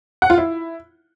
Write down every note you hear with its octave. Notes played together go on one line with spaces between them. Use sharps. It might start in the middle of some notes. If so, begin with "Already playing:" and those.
F#5
F4
E4